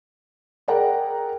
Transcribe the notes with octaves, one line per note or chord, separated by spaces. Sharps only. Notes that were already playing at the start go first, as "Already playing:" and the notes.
G#4 A#4 D5 F#5 G5 A#5